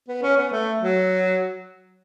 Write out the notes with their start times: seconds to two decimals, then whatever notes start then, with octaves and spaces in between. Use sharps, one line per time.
0.08 B3
0.22 C#4
0.37 B3
0.52 A3
0.80 F#3